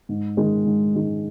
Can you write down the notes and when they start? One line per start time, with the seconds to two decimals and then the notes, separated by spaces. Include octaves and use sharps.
0.09 G#2
0.37 D#3 G#3
0.65 G#2
0.95 D#3 G#3